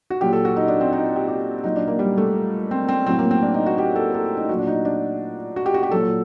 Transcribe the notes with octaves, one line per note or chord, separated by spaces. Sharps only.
F#4
A#2 F#3 G4
A4
F#4
D#4
D4
C4
D#4
G4
G4
A#2 F#3 D#4
D4
A#3
G3
A3
C4
C4
A2 F#3 C4
A#3
C4
D4
D#4
F#4
G4
A4
A4
D#4
A#2 F#3 F#4
D4
D#4
D4
F#4
G4
F#4
G4
A#2 F#3 A4